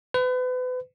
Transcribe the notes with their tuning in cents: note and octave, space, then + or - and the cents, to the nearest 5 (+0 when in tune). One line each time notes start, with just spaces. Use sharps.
B4 +35